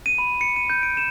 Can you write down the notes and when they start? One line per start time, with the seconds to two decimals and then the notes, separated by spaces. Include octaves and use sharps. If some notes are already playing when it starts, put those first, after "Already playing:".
0.06 D#7
0.18 B5
0.41 C#7
0.56 D#7
0.70 G6
0.83 D7
0.97 E7